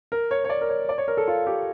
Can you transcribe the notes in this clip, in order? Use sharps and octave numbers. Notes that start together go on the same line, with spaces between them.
A#4
C#5
C#5
D5
A#4
C#5
D5
C#5
A#4
A4
F4
G4